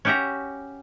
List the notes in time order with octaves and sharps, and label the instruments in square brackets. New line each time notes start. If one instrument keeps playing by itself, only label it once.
[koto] C#4 F#4 G4 E5 A#5